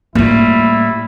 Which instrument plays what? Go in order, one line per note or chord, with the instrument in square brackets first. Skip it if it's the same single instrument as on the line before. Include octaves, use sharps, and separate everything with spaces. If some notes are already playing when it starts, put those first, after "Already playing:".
[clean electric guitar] A2 G3 [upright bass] A#3 F4 [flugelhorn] E4